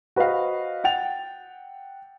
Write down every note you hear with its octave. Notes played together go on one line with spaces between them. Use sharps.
F#4 B4 C5 D#5 F5
F#5 G5 A6 F7